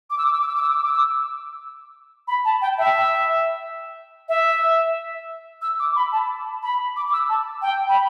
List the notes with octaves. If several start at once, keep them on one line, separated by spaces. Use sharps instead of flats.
D6
E6
D6
E6
D6
E6
D6
E6
D6
E6
D6
E6
B5
A5
G5
E5
E5
E6
D6
B5
A5
B5
D6
D6
E6
A5
G5
B5